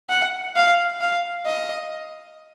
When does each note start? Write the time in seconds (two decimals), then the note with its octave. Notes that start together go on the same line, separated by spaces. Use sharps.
0.10 F#5
0.56 F5
1.01 F5
1.45 D#5